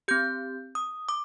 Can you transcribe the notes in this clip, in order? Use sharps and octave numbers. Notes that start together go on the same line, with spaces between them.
C4 G4 G6
D#6
D6